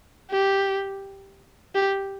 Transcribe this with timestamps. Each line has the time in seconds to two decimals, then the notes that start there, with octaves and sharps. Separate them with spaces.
0.30 G4
1.74 G4